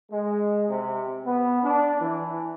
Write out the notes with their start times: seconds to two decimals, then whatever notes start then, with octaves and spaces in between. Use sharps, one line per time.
0.12 G#3
0.69 C3
1.25 B3
1.63 D4
2.00 E3